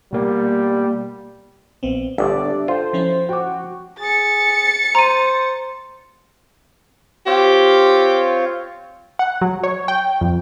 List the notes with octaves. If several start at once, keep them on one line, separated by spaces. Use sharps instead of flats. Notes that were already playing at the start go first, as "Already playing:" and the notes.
B2 G3 A#3
A#1 B3 C4
G1 B3 D4 D5 E5
D4 G4
F4 A4 C5 G5
F3 C#4 E4
F#4 G5 D6
G#4 A6 C#7
C5 A#5 D#7
C4 F4 G4 C#5
F#5
F#3
C#5
G5
F2